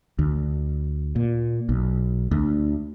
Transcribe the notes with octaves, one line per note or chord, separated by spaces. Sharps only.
D2
A#2
B1
D2